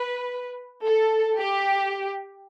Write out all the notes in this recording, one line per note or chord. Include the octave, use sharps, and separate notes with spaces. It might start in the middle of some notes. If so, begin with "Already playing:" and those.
Already playing: B4
A4
G4